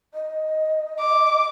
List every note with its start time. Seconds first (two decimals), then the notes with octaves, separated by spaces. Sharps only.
0.14 D#5
1.00 D6